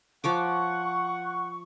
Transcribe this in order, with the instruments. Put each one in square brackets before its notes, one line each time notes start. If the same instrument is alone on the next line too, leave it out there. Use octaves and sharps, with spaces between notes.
[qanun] F3 C#5 D6 [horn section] F#5 [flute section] C#6